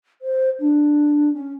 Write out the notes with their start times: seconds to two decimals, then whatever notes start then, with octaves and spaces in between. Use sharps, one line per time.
0.22 C5
0.60 D4
1.33 C#4